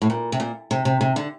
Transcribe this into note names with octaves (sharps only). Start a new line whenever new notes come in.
A2
A#2
C3
A#2
C3
C3
C3
D3